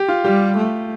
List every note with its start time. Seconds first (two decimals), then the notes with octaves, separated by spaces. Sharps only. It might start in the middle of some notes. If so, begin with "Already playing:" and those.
Already playing: G4
0.08 F4
0.24 G3 G4
0.57 A3